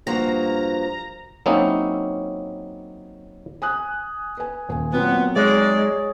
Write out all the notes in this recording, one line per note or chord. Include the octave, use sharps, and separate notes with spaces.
G2 F3 A#3 F#4 A#5
F#3 A#3 C4 C#4 D#4 E4
G#5 D#6 F#6
B4 G#5
D#1 G#5
A#2 F#3 B3 C4 F#4
G#3 D#4 G#4 C#5 D5